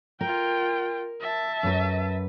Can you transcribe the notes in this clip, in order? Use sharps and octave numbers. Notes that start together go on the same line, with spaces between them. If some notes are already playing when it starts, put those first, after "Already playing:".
F4 A#4 G5
E5 A5
F#2 B4